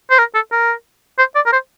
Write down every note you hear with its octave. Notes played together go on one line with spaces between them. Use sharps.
C5
A#4
A4
A#4
C5
D5
A#4
C5